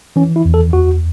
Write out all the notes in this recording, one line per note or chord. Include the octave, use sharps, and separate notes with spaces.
E3 C#4
E4
E2
A4
E2 F#4